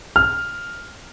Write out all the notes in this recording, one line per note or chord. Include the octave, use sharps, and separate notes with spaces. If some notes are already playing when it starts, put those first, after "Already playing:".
F6